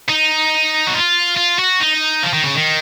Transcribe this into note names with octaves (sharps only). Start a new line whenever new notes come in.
D#4
F#4
F4
F4
F#4
D#4
F3
D#3
C#3
D#3